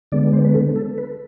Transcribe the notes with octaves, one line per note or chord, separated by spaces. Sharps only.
D3 G#3 B3 D5
C5
B4
A4
A4
B4